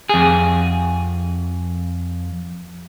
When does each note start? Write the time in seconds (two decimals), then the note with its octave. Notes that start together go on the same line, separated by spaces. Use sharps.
0.09 F2 G#4